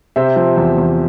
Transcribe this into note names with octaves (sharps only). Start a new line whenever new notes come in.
C3 C5 E5
F3
E2
E2